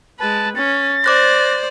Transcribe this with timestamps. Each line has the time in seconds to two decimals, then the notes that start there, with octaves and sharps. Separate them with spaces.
0.19 G#3 B4 A5
0.56 C#4 A6
1.04 C5 D5 D6 F#6 A#6